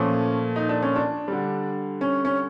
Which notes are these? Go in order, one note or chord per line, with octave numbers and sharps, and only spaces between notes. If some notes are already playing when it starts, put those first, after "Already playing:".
Already playing: A#2 F3 A3 C#4
D#4
D4
C#4
D4
D3 G3
C#4
C#4